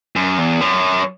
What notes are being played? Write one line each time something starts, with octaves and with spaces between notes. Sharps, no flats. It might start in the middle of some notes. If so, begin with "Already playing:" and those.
F#2
E2
F#2